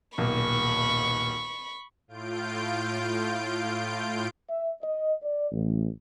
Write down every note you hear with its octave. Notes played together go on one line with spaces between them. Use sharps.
D#1 B1 A#3 B5 C#6
A2 F4 G6 D7
E5
D#5
D5
A1